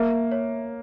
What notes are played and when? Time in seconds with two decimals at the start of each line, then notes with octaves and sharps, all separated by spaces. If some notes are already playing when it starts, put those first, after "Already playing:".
Already playing: A#3 E5
0.32 C#5